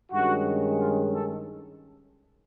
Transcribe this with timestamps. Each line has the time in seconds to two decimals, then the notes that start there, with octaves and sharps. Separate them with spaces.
0.11 G2 D#3 G#3 C#4 F#4
0.79 F4
1.14 A4